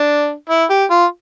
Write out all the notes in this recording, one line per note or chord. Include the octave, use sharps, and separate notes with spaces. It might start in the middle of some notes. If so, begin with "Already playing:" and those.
Already playing: D4
E4
G4
F4